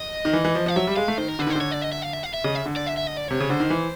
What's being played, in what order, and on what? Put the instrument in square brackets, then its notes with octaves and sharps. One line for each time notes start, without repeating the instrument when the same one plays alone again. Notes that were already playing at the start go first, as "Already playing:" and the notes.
Already playing: [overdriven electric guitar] D#5
[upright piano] D#3
E3
E3
F3
[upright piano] F3 [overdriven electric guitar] F5
[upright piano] F#3 [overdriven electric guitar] E5
[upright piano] G3
[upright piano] G#3 [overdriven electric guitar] F5
[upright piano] A3
[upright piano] D#3 [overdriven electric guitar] C5
[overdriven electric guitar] A#4
[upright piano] D3 [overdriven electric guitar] B4
[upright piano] D#3
[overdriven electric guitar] C5
[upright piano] D3
[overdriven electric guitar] C#5
D5
D#5
E5
F5
E5
F5
E5
[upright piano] C#3 [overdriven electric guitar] D#5
[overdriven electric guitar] E5
[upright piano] D3
[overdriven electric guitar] D5
E5
E5
D#5
D5
[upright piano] C3 [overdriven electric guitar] C#5
[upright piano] C#3
[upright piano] D3 [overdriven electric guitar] C5
[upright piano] D#3
E3